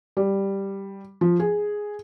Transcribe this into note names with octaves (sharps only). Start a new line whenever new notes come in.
G3
F3
G#4